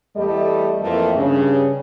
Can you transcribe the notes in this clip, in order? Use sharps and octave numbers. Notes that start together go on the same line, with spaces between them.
E2 G3 A3 A4 D#5
F2 E3 A3 A#3 A#4
G2 C#3